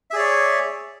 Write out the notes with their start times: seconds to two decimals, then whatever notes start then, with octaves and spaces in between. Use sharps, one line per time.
0.11 E5
0.13 G#4
0.16 D5
0.18 C#5